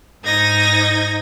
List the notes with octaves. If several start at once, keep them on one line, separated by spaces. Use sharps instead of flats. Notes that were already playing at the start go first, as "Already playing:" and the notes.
G#2 D#4 G#6 A#6